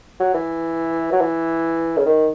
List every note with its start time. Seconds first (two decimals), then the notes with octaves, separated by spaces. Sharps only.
0.20 F#3
0.34 E3
1.12 F#3
1.20 E3
1.97 C#3
2.06 D#3